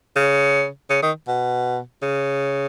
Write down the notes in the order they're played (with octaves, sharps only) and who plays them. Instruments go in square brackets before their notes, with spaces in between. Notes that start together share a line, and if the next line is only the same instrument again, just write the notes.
[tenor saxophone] C#3
C#3
D#3
B2
C#3